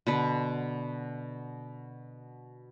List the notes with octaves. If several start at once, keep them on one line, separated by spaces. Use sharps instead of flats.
B2 D3 B4